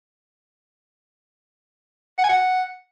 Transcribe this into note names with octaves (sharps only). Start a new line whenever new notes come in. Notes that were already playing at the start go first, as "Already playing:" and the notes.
F#5
G#5
F#5